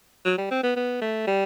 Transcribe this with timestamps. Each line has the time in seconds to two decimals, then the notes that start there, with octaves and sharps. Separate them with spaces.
0.25 F#3
0.38 G3
0.51 C4
0.63 B3
0.76 B3
1.01 A3
1.27 G3